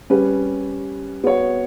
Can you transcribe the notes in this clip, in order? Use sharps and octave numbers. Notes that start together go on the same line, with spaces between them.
G3 C#4 G4 B4
B3 F#4 C#5